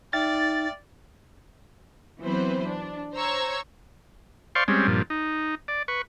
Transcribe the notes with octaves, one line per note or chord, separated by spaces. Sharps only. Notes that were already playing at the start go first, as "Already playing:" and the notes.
D#4 D5 E5 G5 F6 A6
E3 F#3 B3 C4 B4 C5
D4
C5 C#5 A#5 C#6 E6 G#6
C5 D5 F5 C6 C#6
G3 G#3 C4 C#4
G2 A#2 F3
D#4
D5
B4 C#6